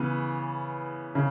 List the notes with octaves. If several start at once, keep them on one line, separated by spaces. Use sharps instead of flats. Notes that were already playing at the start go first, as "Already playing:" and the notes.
Already playing: C#3 E3 B3
C#3